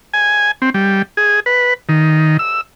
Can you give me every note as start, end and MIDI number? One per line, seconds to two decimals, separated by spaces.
0.14 0.51 80
0.62 0.70 60
0.74 1.02 55
1.17 1.40 68
1.46 1.74 71
1.89 2.37 51
2.39 2.61 88